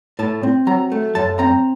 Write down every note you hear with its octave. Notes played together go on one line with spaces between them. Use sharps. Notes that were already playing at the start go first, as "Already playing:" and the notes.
A2 A5
C4
F#3 A#5
A3
F#2 A5
C4 A#5